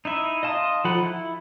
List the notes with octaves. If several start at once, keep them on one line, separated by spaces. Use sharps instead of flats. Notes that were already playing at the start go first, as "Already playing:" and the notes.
D#4 E4 E5
D#5 F5 A5 C6 D#6
F3 D#4 A4 F#5 B5
E4